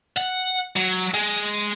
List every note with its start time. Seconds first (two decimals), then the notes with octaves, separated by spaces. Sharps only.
0.17 F#5
0.76 F#3
1.14 G#3